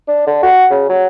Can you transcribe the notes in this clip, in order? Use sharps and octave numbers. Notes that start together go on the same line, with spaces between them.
D4
D3
F#4
C#3
F#3